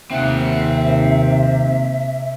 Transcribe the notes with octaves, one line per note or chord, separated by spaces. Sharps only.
D#2 C3 C4 E5 F#5